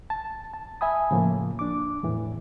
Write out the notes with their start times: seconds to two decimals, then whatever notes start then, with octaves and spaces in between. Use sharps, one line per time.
0.10 A5
0.54 A5
0.81 E5 G#5 B5 D#6
1.11 A2 C#3 F3 A#3
1.59 D4 D6
2.03 E2 A2 E3